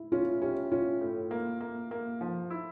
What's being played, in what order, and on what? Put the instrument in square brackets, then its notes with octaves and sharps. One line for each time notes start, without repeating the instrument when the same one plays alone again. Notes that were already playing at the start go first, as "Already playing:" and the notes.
Already playing: [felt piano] E4
[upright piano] C#4 [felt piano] F4
[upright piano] C#4 [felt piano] G4
[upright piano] C#4 [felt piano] F4
[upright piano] A2
A#3
A#3
A#3
F3
E4